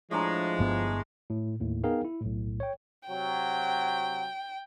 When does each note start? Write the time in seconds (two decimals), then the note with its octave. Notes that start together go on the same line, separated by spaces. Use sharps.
0.11 A2 F3 G#3 D4 A#5
0.59 G1 G2 B3
1.30 A2
1.60 D#2 A2
1.84 B3 D#4 G#4 A#4 F5 G5
2.05 E4
2.21 B1 A2
2.60 C#5 G5
3.09 C3 F#3 G5